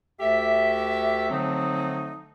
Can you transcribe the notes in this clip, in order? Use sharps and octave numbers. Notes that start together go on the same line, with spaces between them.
D2 G4 A4 E5
D3 F3 F#3 A3 C4 D#4